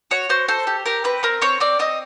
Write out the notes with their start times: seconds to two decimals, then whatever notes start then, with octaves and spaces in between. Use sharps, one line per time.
0.11 F#4 C#5
0.29 F#4 C5
0.48 A4 C5
0.67 G4
0.86 G4 A#4
1.04 C4 B4
1.23 C4 A#4
1.42 C4 C#5
1.60 C4 D5
1.79 C4 D#5